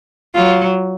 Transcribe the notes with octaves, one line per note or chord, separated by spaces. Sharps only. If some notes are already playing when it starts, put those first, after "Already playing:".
F#3 F4